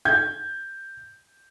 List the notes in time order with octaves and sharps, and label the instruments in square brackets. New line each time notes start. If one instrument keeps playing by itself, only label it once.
[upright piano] G6 G#6